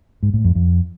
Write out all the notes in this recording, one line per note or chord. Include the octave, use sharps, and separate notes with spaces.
G#2
A2
F2
F2